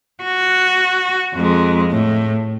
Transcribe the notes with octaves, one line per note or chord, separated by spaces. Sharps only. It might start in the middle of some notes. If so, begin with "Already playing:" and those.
F#4
F2 G#3
A2